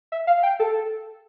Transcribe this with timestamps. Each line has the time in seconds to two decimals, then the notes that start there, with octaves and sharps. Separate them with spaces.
0.12 E5
0.27 F5
0.43 G5
0.60 A4